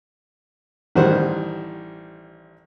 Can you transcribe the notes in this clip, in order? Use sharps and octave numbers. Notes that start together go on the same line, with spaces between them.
A1 D#3 G3 C5 F#5